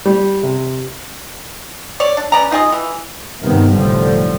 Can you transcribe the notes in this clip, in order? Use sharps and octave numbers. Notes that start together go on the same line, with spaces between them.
G3
C3
C#5 D5
D4
C#4 B4 D5 A#5
D#4 F4 G#4 D#5
E3
G2 C3 D#3 B3
F1 B1 A2 D3 F3 G3